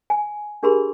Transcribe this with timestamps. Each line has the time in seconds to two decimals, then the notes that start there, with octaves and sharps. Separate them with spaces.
0.10 G#5
0.63 D4 G4 G#4 A#4 B5 C6